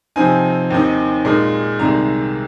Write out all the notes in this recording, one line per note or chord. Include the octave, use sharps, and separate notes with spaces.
C3 F3 C4 D#4 G#5
D#2 D#3 C4 D#4
A#2 G#3 D#4
C2 C3 D#3 G#3 A#5